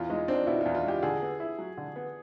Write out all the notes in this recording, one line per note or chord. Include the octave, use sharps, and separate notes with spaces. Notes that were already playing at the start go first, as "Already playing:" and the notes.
Already playing: E2 F4
G#3 D#4
C4 D4
B2 E4
F4
E2
F4
G#3 G4
D3 G#4
B3
E4
F#3
D3
B3